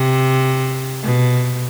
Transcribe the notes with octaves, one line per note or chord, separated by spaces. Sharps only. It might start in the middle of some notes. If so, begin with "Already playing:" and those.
Already playing: C3
B2